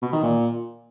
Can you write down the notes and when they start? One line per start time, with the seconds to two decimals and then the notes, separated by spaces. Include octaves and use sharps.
0.02 B2
0.13 D#3
0.23 A#2